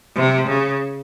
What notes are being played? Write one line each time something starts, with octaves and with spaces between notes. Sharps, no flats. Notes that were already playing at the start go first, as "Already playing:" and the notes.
C3
C#3